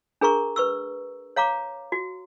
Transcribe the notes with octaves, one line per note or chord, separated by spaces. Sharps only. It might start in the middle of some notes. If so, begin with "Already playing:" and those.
D4 G#4 A#4 A#5 C#6
B4 C#6 E6
C#5 F5 A#5 D6
F#4